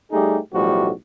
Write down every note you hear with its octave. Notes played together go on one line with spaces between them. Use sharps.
G3 A3 D#4 G4 G#4
B1 A2 F3 G3 A3 F#4